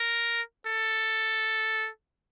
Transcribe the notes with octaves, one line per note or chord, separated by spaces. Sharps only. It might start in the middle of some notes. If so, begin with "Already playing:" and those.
Already playing: A#4
A4